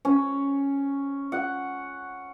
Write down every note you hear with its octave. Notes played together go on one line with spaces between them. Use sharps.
C#4
F#5